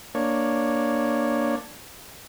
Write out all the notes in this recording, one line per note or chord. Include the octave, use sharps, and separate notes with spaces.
A#3 D4 C#5